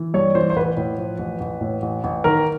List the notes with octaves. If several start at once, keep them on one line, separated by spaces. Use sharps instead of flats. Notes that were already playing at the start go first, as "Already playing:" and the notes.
Already playing: E3
G2 C#5
E3 C5
C5
A1 B4
A2
F3
A1
A1
A2
A1
A1
D#3 A#4